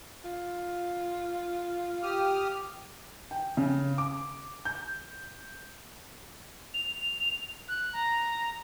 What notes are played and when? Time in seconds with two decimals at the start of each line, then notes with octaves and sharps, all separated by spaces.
0.25 F4
2.03 G4 D#6 F6
3.31 G5
3.57 C#3
3.98 D6
4.65 G6
6.74 F7
7.68 F#6
7.93 A#5